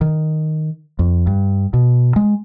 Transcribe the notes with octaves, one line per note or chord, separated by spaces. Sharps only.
D#3
F2
G2
B2
G#3